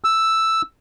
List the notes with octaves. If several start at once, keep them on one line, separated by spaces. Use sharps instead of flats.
E6